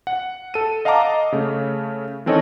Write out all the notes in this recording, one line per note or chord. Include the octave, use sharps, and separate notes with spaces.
F#5
A4 D#7
D#5 F5 F#5 A5 A#5 D6
C#3 A3
D#3 E3 C4 A4 C#5 D#5